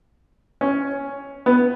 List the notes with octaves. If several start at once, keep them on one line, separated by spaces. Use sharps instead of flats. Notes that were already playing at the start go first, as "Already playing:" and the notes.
C#4
B3